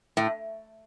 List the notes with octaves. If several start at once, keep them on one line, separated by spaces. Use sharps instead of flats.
A2